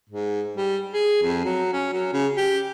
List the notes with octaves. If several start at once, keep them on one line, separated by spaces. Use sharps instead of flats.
G#2
G3
G#4
F2
F#3
C#4
F#3
C#3
G4